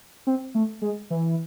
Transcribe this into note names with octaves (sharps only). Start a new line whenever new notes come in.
C4
A3
G#3
E3